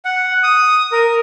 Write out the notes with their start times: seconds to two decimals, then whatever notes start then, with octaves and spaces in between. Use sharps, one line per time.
0.05 F#5
0.43 D#6
0.92 A#4